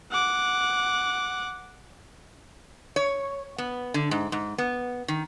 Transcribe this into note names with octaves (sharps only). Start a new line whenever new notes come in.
F#5 D6
C#5
B3
D3
G#2
G#2
B3
D#3